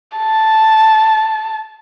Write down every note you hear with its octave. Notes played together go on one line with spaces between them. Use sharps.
A5